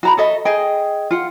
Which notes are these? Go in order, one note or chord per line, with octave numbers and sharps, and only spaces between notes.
F#4 A#5 B5
F#4 A4 D#5 E5
G#4 D#5 G5
F4 F#5